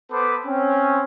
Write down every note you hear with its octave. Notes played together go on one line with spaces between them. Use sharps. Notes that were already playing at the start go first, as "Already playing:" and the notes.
B3 A4 B4 C5 B5 D6
C4 C#4